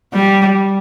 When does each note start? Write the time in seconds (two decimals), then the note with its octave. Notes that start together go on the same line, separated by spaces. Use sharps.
0.14 G3